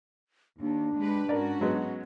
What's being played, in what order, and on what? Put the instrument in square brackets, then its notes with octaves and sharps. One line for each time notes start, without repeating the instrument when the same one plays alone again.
[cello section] D#2 [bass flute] D4
[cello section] G#3 G4 B4
[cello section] G#2 C#4 F#4 [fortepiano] A#4 D5
[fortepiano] F#3 G#3 B3